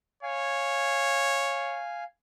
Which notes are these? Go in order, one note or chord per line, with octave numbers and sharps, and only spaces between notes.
C#5 F5 G#5